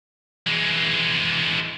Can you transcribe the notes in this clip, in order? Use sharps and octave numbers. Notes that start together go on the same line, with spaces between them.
E3 G#3